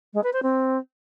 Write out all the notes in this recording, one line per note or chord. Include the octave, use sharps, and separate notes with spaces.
G#3
B4
C5
C4